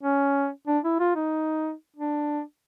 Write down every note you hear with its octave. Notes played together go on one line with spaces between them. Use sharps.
C#4
D4
E4
F4
D#4
D4